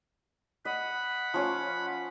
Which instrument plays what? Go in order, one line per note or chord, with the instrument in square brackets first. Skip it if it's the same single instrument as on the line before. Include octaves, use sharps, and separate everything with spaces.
[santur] D#5 [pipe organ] F#5 B5
[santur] F3 C#4 F5